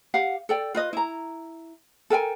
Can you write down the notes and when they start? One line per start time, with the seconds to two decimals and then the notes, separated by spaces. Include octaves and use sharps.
0.14 G4 F5 F#5
0.49 A4 D5 G5
0.75 F4 B4 D#5
0.93 E4 A#5
2.10 A4 A#4 G5 G#5